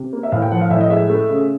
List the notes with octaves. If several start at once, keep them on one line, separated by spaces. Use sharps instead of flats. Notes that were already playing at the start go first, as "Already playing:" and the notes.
Already playing: C3
A#3
E5
A2 F5
G5
F3 F#5
F5
A2 E5
D#5
G#3 E5
A3
C#3